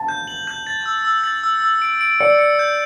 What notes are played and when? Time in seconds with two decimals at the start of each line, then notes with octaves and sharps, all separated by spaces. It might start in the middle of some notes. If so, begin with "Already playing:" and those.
Already playing: A5
0.08 G6
0.27 F#7
0.47 G6
0.67 A6
0.86 E6
1.05 E6
1.24 A6
1.44 E6
1.62 E6
1.82 D7
2.01 D7
2.20 D5 C#7
2.39 C#7
2.59 G6